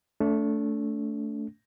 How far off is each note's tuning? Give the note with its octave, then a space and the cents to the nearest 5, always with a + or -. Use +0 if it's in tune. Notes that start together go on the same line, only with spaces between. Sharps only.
A3 +0 D4 -40